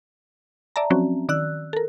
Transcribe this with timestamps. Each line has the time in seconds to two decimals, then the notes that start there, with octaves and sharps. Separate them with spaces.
0.76 D5 E5 A5 A#5
0.90 F3 F#3 C4 C#4 F#4
1.29 D#3 D5 E6 F#6
1.73 A4 A#4